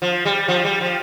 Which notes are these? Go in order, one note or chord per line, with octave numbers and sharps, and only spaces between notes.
F3
G3
F3
G3
F3